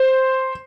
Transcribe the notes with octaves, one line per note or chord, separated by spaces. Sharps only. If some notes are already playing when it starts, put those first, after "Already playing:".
Already playing: C5